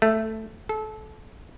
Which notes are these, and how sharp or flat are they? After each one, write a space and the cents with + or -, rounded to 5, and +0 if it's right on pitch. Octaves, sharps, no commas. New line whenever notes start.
A3 +0
A4 -25